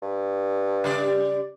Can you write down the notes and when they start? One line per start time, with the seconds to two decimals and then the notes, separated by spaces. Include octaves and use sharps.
0.02 G2
0.84 C#3 G3 D5